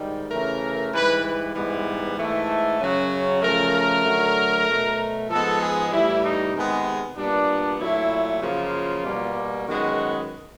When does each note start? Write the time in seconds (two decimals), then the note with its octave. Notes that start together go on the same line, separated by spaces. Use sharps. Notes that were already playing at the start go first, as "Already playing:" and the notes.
Already playing: G#2 D#3 G3
0.30 C#3 E3 A3 A#4
0.93 G#2 E3 G3 B4
1.24 B4
1.55 G#2 E3 G3 B3
2.17 G#2 E3 A3
2.80 F#2 C#3 F#3
3.42 C#3 F3 A3 A#4
4.04 D3 F#3 A3
4.68 B2 F#3 A3
5.29 G#2 F3 G#3 B3 A4
5.61 G#4
5.92 A2 E3 G3 E4
6.23 D#4
6.54 C3 D#3 G#3 B3
7.17 A#2 G3 B3 D4
7.79 A#2 F#3 A3 E4
8.41 F#2 C#3 F3 A#3 F4
9.04 B2 G3 A#3
9.67 F#2 D#3 G#3 B3 F#4